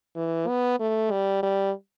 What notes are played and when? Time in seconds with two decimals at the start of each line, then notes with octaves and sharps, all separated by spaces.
0.16 E3
0.48 B3
0.80 A3
1.11 G3
1.43 G3